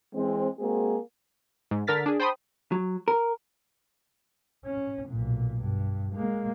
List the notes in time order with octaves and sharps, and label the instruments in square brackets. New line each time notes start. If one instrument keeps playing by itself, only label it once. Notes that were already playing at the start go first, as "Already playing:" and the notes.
[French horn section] E3 G#3 C4
G#3 A#3 C4 F#4 G#4
[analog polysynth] G#2
D3 A#4 F6 A6 B6
D4 G#4
C5 G5 A5 B5 C6 D#6
[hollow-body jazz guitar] F#3
A#4
[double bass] C#4
B1 A#2
G2
G#3 A#3